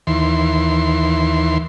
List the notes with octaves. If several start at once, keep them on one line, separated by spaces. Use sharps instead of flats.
D#2 E3 C6